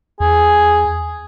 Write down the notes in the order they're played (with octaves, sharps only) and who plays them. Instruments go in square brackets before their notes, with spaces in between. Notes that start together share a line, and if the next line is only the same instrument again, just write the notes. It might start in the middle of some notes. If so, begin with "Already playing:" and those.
[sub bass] E2 [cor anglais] G#4